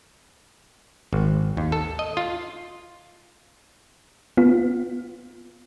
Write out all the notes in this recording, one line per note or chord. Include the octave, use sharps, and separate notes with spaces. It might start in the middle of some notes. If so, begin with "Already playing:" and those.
G#1
D#2
A4
D#5
F4
B3 F4